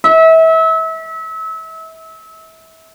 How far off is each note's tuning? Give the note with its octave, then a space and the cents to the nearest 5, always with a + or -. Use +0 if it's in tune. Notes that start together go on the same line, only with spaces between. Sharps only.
E5 -30